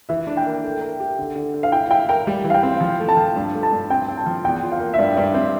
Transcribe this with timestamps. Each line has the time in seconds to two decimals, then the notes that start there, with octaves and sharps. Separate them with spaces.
0.09 E3 E5
0.27 D4
0.37 G5
0.46 A#3
0.64 A3
0.81 A#4
1.00 G4
1.19 D3
1.36 D3
1.54 D3
1.63 F5
1.72 E4 G5
1.91 E4 G5
2.09 A#4 G5
2.27 G3
2.44 E3
2.50 F5
2.54 G5
2.63 C4
2.81 F3
3.00 A3
3.09 A5
3.17 F3
3.36 G2
3.54 A3
3.63 A5
3.72 G2
3.90 C4 G5
4.08 C4
4.17 A5
4.26 F3
4.45 E2 G5
4.63 F4
4.72 F5
4.80 A#3
4.94 E5
4.98 G2 D5
5.12 E5
5.16 G2 D5
5.34 C4 E5